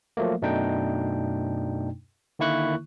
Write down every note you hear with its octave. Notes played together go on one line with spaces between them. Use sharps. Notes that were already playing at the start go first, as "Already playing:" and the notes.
F3 F#3 A3 A#3
F#2 B2 A3 D4 D#4 G5
D3 D#3 A#3 E4 C#6 F#6